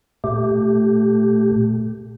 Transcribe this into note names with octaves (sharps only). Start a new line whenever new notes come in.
A#2 A3 G4